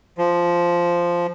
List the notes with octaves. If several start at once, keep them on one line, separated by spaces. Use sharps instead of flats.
F3